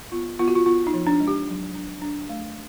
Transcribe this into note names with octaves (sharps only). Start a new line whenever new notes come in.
B3 F4
B3 F4
F#4
F4
B3 F4
D#4
F3
D4
G#3
G4
F#3
D4
D4
A3